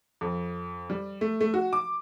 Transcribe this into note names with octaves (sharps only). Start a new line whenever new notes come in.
F2
G3
A3
A3
F#4
D6